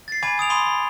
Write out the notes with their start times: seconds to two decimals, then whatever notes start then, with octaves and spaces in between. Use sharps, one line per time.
0.08 A6 C7
0.23 G#5 B5 D6 G#6
0.38 G#5 D#6 D7 F7
0.50 B5 C6 D6 D#6 D#7 G7
0.66 B5